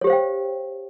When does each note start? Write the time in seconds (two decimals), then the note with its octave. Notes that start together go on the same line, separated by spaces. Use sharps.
0.01 C#5
0.04 G4
0.07 C5
0.10 F5
0.13 G5